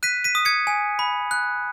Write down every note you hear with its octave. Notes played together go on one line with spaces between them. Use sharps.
F#6 B6 D#7
B6 D#7
D#6
G#6 C#7
G#5
B5
F#6